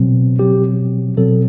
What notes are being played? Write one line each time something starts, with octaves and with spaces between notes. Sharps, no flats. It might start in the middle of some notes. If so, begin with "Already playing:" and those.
Already playing: B2 F#3 C4
B2 F#3 C4 G4
B2 F#3 C4 A4